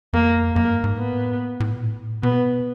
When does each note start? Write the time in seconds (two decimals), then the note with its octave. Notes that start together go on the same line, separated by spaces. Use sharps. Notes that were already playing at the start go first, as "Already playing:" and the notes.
0.13 F2 A#3
0.55 F#2 A#3
0.70 G2
0.84 G#2
0.97 A2 B3
1.60 A2
1.74 A#2
1.86 A2
2.23 B2 B3